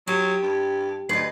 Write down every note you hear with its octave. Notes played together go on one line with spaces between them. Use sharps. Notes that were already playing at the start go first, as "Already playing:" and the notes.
F#3 G4
G2
D2 B4 D#5 C7